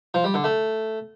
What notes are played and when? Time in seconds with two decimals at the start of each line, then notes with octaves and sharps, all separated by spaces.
0.14 F3
0.24 G3
0.34 D3
0.44 A3